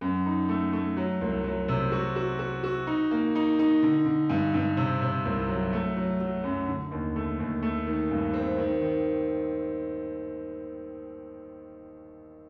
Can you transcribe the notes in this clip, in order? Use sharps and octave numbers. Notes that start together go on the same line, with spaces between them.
F#2
D#4
A3
A3
F#3
C2
F#3
C3
F#4
F#4
F#4
F#4
D#4
A#3
D#4
D#4
D3
D3
G2
G2
C3
C3
C2
F#3
A3
F#3
F#3
F#2
D3
D#2
A3
D#2
A3
D#3
G2
C4
D#3
D#3